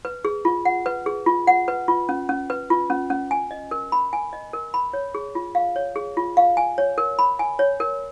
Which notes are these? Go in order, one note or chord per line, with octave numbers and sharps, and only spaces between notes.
B4
G#4
F4
F#5
B4
G#4
F4
F#5
B4
F4
C#4
C#4
B4
F4
C#4
C#4
G#5
D#5
A#4
B5
G#5
D#5
A#4
B5
C#5
G#4
F4
F5
C#5
G#4
F4
F5
G#5
C#5
A#4
B5
G#5
C#5
A#4